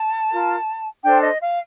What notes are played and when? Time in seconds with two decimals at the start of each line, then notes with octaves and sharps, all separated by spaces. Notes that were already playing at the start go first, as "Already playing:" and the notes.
Already playing: A5
0.30 F4 A#4
1.03 D4 A4 C5 G5
1.22 D#5
1.41 F5